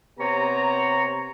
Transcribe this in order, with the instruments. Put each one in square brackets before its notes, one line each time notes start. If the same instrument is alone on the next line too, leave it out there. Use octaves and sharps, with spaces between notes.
[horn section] C3 B3 G4 C#5 A#5